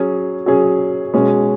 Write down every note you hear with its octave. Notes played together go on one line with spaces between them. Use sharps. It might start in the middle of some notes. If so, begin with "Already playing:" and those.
Already playing: F#3 C#4 G#4
F#3 C#4 G#4
B2 G#3 C#4 G#4